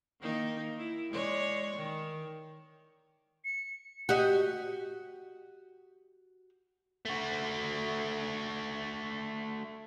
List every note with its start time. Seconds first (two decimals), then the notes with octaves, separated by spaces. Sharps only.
0.21 D#3 A#3 D#4
0.78 E4
1.11 G#3 C#5 D5
1.77 D#3
3.45 C#7
4.09 F#4 G4 D#5
7.05 A3 F#4